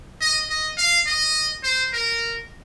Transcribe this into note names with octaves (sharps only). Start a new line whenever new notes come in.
D#5
D#5
F5
D#5
C5
A#4